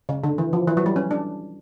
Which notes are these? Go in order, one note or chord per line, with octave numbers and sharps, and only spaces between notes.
C#3
D3
E3
F3
E3
F#3
G3
C#4
D4